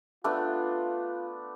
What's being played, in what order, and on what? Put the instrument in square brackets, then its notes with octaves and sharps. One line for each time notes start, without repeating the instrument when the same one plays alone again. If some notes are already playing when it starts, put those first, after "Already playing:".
[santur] A3 B3 D4 [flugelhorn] F4